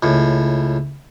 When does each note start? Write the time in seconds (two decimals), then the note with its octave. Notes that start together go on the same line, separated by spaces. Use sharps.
0.03 C#2 A2